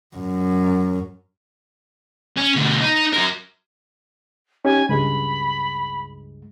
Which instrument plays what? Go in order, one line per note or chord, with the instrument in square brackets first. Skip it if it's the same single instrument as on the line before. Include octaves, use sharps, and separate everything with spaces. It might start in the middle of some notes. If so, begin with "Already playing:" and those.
[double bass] F#2
[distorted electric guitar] C#4
D2 B2
D#4
F#3 A#4
[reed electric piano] C#4 D#4 G4 [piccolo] G#5
[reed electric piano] C#2 G2 G#3 [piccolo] B5